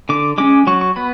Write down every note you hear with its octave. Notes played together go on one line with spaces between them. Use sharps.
D3 D6
G#3 C#4 D6
F#3 C#6
C#6
B3 B5